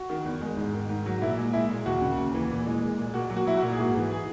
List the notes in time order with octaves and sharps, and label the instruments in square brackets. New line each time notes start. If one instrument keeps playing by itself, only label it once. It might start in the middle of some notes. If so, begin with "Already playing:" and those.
Already playing: [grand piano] F#4
D#3
E2
G#3
G#2
D#3
G#2
F#3
A#2 E4
G#3
G#3 E4
A#2
D#2 F#4
C#3
D#2
E3
A#2
G#3
G#3
A#2
A#2 F#4
F#3
F#4
F#3 E4
F#4
A#2
G#4
G#2 F#4
E3
G#4